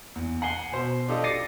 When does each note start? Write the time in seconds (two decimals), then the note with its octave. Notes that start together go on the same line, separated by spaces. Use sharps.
0.16 E2
0.42 F#5 G#5 C7 G7
0.72 B2 C5 C6
1.08 D4 F4 G4 A4 D#5
1.24 D6 A6 A#6 C7 C#7 D#7